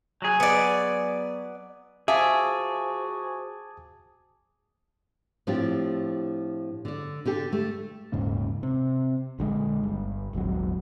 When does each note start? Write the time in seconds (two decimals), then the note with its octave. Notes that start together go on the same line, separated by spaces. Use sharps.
0.22 F#3 G#4
0.40 B3 D5
2.08 F3 F#4 G#4 E5 F5 A5 D6 D#6
5.47 A2 F3 C4 D4 F4 G4
6.85 D3 D5
7.25 D3 D4 G4 A4
7.52 A3
8.12 D#1 G#2 C#3 A#3
8.63 C3
9.39 A#1 D3 E3 G#3
9.83 G1 G2
10.33 D#1 G#1 G#2 F#3